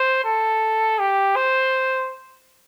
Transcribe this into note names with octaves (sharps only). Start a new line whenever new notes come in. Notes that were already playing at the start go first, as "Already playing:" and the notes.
Already playing: C5
A4
G4
C5